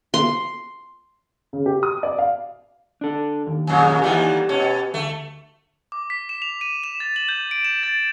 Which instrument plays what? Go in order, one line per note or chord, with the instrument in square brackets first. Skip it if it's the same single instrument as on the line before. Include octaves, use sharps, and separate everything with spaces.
[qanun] C6
[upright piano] C#3
G4
D#6
D5
F5
[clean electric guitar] D4 A4
D#2
[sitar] F2 A#2 C#3
[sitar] D#3 E3 A3 [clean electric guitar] G4 D5 F#5
[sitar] B2 C#4
[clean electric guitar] D2 [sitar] A3
[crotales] D6
B6
E7
F7
D#7
E7
A6
F#7
G6
D7
E7
A6